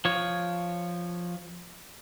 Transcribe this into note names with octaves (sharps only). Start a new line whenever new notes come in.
F3 C#5